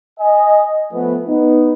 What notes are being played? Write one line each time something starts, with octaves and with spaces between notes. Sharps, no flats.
D#5 G#5
F3 A3 B3
B3 D#4